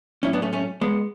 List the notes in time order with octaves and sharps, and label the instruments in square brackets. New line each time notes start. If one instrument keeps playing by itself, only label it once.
[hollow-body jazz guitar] A2 F#3 C#4 E4
B3 D4
A3 C#4
A3 C#4
G#3 B3